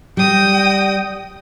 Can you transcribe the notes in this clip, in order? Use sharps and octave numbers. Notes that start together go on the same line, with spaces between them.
G3 G5 D#6 A#6